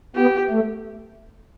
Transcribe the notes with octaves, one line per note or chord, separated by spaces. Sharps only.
B3 G4
A3